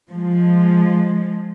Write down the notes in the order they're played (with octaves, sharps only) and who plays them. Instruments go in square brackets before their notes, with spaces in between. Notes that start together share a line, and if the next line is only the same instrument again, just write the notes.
[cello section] F3 G#3